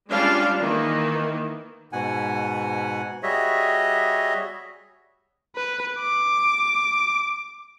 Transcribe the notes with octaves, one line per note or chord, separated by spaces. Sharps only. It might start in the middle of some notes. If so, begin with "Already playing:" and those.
G3 G#3 C#4 D4 F4 F5
D#3 E3 A#3
G#2 B2 F#5 G#5
G3 F#4 G#4 C#5 D#5 E5
B4
D6